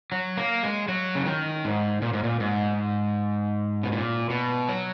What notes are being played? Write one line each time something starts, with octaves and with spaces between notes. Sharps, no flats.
F#3
A#3
G#3
F#3
C#3
D#3
G#2
A#2
G#2
A#2
G#2
B2
A#2
B2
F#3